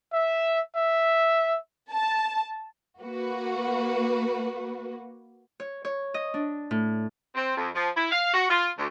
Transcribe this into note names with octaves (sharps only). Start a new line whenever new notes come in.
E5
E5
A5
A#3 F#4 B4
C#5
C#5
D#5
D4
A2
C4
F2
F3
E4
F5
F#4
F4
D2